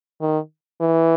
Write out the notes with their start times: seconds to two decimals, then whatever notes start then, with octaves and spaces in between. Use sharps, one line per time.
0.21 D#3
0.81 E3